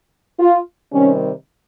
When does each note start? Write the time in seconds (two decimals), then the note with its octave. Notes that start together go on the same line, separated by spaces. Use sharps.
0.40 F4
0.92 C3 D#3 G3 C#4